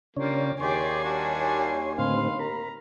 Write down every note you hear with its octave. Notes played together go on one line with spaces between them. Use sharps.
C#3 G3 A#3 D4 F4 C#5
D#2 G4 G#4 C#5 D5 G#5 C6
G3 D4 F#4
A2 D3 C4 B4 F5 C6
A#4 A#5 B5